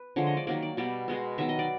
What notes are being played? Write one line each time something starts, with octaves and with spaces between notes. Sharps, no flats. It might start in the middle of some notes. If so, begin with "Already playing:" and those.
Already playing: B4
D3 F3 G#3 C#5
D#5
D5
D#3 F#3 A#3 D5
D5
B2 G3 B3 D5
B2 G#3 B3
D#3 F#3 B3 E5
D#5
D5